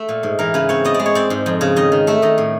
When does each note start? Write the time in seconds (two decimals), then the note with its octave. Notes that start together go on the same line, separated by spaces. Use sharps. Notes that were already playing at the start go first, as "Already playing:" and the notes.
Already playing: A3 E5
0.09 A#2
0.23 G#2
0.39 E3 A#4
0.54 C#3 B4
0.69 C4 C#5
0.85 B3 D#5
0.94 D5
1.00 G#3
1.06 C#5
1.15 C4 D5
1.30 G#2
1.46 F2
1.61 C#3
1.76 D#3 D#5
1.92 D#3
2.07 A3 E5
2.22 D#3 D#5
2.38 A2